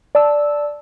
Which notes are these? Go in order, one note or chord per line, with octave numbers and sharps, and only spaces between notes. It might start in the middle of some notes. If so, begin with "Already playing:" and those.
D5 A5 E6